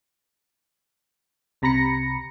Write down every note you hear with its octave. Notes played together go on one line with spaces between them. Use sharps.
C2 C3 A#5 B5 A#6 C#7